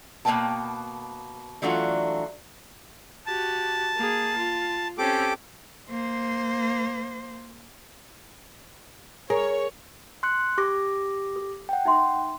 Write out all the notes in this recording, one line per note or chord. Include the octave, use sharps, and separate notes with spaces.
B2 A#3 C#4 B4 G5 A5
E3 F#3 A3 D4 F4 F#4
F#4 G4 A5
A#3 G#4
F4
C4 C#4 G4 A4 D6
A#3 C5
G#4 A#4 C#5
C6 F#6 C#7
G4 C#6 D6 A#6
A4
F#5 G5
D#4 E5 C6